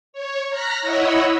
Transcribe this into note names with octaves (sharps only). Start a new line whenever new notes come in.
C#5
A#5 F6 F#6 A#6 B6
E4 C#5 D#5 F#5 B5 E6